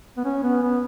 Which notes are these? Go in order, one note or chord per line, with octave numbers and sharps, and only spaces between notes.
B3
C#4
B3
B3